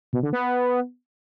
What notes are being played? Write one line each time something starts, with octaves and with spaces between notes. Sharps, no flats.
B2
D3
B3